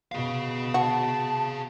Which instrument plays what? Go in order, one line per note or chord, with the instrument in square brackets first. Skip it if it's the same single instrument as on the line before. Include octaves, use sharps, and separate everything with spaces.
[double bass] B2 [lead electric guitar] G#4 F5
[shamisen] F#4 [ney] A5